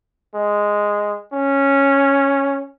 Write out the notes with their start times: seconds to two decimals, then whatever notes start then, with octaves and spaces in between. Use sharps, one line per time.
0.35 G#3
1.33 C#4